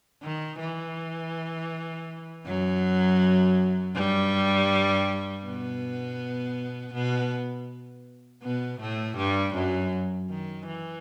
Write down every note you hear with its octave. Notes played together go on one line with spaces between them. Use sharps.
D#3
E3
F#2 F#3
G2 G3
B2 B3
B2 B3
B2 B3
A2 A3
G2 G3
F#2 F#3
D#3
E3